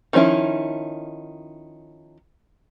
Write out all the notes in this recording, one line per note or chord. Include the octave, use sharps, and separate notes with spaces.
D#3 F3 C#4 D#4 E4